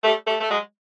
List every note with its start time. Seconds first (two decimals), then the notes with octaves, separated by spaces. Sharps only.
0.04 G3 A3
0.27 G3 A3
0.40 A3
0.49 F#3 G#3